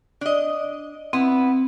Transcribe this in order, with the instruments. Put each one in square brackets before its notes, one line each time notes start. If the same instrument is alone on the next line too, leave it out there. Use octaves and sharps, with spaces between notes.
[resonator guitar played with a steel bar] D4 D#5
[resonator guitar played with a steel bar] B3 E4 [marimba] C4